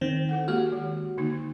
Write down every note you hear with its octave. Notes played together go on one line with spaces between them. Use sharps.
D#3 C4
E4 A4 F#5
G#3 A#3 F#4 G4
D#3
D3 A#3 D#4